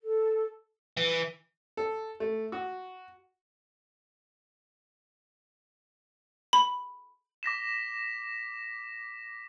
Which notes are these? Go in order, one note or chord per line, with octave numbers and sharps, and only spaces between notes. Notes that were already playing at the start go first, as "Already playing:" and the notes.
A4
E3
A4
A3
F#4
B5
D6 A#6 B6 E7